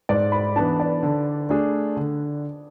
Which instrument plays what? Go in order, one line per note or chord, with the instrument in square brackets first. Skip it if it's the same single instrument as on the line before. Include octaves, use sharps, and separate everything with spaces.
[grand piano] G#2 [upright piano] D5
[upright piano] B5
[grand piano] E3 B3 D4 [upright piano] A5
[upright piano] D5
[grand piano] D3
A3 D4 G#4
D3